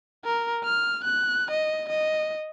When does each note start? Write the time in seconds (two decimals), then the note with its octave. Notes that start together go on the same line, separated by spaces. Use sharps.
0.25 A#4
0.64 F6
1.04 F#6
1.51 D#5
1.89 D#5